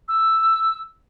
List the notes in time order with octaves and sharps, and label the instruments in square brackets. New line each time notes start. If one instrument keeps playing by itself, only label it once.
[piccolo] E6